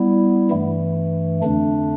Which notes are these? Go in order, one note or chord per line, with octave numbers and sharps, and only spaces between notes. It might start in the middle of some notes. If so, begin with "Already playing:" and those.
Already playing: G3 B3 E4
G2 E3 A3
F2 D3 A3 D4